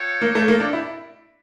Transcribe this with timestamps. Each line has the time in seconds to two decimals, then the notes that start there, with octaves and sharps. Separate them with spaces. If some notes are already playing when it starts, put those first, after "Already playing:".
Already playing: F4 A4 C#5 G5
0.21 A#3
0.35 A3
0.48 A#3
0.60 D4
0.73 E4